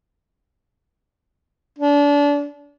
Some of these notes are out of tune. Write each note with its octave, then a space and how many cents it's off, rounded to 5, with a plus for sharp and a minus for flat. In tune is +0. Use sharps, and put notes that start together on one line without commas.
D4 -30